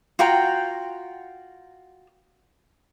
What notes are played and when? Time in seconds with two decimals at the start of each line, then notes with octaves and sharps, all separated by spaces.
0.19 F4 F#4 G5 A#5